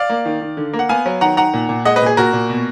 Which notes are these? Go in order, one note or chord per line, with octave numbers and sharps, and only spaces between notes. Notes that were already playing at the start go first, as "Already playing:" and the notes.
Already playing: D5 F5
A#3
D#3
D#3
D3
A#3
F#5
B3 F5 G#5
F#3
D#3 F#5 A#5
D#3 F#5 A#5
A#2
A#2
G#3 D#5 F#5
B4 D#5
A#2 G#4
A#2 F#4 A#4
A#2
B2